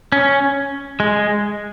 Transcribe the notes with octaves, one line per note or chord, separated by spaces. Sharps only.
C#4
G#3